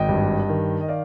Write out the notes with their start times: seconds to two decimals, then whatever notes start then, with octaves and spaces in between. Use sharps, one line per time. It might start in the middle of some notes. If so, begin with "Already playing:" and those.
Already playing: G#1 D#5 G5
0.09 G2
0.49 D#3
0.81 D#5
0.88 D5 F5